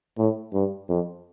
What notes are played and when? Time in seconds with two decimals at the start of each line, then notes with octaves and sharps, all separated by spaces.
0.18 A2
0.53 G2
0.89 F2